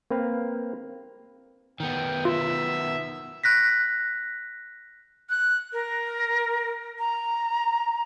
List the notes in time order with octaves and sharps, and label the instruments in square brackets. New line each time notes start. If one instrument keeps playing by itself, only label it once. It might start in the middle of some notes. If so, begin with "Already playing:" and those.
[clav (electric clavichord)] A#3 C4 B4 F5
[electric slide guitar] D#3 B3 [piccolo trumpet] G5
[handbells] F4 [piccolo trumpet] E5
[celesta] F#6 A#6 B6
[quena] F#6
A#4
A#5